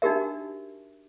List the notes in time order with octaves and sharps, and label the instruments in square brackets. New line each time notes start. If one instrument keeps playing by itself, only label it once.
[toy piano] D4 D#4 F#4 G4 A#4 E5